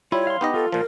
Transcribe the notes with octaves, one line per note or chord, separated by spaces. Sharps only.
G3 E4 F4 C#5
F5 C6
B3 D#4 G4 D#5
F4 A4
A#2 F3 A#4